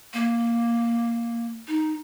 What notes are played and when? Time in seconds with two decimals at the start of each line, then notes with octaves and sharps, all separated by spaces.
0.13 A#3
1.68 D#4